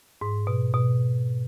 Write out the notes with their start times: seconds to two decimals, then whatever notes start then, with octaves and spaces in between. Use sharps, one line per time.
0.21 G#2
0.47 B2
0.74 B2